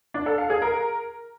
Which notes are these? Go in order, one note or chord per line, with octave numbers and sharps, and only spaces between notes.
D4
A4
F5
G#4
A#4